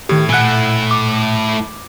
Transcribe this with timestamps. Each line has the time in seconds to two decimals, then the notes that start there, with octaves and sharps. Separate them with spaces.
0.09 A2 D#3 G4
0.29 A#2 A3 E4 F#5 G#5 F#6
0.91 D6